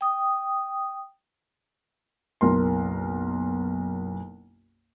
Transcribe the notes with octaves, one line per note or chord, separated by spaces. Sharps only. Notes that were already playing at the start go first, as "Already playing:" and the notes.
G5 D#6
F#1 B1 A#4 C6